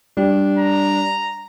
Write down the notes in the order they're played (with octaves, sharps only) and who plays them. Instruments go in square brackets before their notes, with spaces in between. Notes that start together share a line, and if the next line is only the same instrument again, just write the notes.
[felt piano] G3 [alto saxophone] D4
[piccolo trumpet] A#5